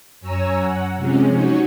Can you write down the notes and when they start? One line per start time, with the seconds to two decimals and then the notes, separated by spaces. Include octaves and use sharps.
0.21 F#2 C#5 G#5 A#5 E6
0.58 F#5
0.96 C3 F3 G#3 C#4
1.33 F#3 D#4 F#4 C#5